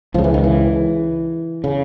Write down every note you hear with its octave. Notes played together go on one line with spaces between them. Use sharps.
C#2 C#3 F3
E3
D#3
E3
C#3